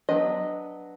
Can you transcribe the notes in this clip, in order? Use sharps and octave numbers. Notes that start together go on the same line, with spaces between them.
F#3 B3 D4 D#5